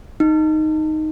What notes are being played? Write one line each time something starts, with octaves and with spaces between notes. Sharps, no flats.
D#4